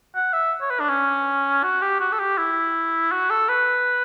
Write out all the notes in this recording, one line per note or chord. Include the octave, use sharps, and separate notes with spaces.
F#5
E5
C#5
B4
D4
C#4
F#4
G4
F#4
A4
G4
E4
F#4
A4
B4